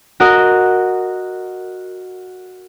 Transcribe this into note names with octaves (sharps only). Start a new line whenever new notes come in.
F#4 A#4 D#5